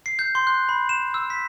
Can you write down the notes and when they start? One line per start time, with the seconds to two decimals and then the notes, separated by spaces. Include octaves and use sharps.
0.06 C7
0.19 G6
0.35 C6
0.47 F#6
0.69 B5
0.89 E7
1.14 E6
1.30 B6